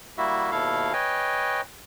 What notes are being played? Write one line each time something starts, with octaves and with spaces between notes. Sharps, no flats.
G3 A#3 E4 F#4 E5
D#2 B2 E4 A4 F5
B4 C#5 D#5 G5 G#5